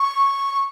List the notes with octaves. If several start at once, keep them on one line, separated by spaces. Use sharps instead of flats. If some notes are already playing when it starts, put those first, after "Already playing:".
Already playing: C#6
C#6